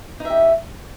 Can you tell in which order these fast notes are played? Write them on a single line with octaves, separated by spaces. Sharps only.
D#4 E5 G4